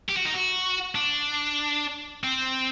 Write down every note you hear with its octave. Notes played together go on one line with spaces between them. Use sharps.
G4
F#4
D#4
F#4
D4
C4